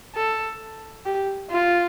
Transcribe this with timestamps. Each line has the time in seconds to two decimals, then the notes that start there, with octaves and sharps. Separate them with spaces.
0.15 A4
1.05 G4
1.51 F4